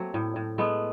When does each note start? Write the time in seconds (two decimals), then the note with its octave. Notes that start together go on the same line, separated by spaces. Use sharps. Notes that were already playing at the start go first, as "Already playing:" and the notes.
Already playing: F#3 A3 A#3 C4
0.14 A2
0.36 A2
0.58 G#3 A3 B3